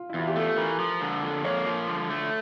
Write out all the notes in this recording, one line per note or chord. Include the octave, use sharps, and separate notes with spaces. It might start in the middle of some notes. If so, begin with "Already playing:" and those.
Already playing: F4
E4
E2 F4
G4
A3 A4
E3 A#4
F3
D3
F2
A#3 C#5
F3
D3
A3